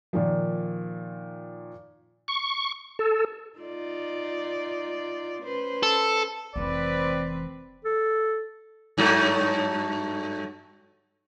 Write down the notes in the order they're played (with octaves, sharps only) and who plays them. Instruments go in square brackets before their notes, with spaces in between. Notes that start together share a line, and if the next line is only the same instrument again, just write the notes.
[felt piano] A#2 D#3 F3
[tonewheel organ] C#6
A4
[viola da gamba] D#4 F4 D5
C#4 B4 C5
[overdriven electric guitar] A4
[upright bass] F1 E3 [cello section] C4 B4 [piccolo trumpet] D5
[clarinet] A4
[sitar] G2 F#3 A3